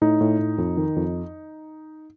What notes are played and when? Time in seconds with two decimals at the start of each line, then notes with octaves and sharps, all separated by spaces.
0.01 A2 D#4
0.21 A2
0.39 A2
0.58 F2
0.77 D#3
0.96 F2